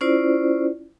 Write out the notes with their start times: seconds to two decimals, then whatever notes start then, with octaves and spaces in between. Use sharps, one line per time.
0.01 C#4 E4 F4 C5 D5